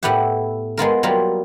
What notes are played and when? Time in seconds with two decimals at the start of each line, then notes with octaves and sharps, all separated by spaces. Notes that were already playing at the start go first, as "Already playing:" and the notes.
0.03 A2 B3 E4 G4 F#5
0.77 G#3 B3 F4 A#4
1.03 F#3 G3 A#3 F4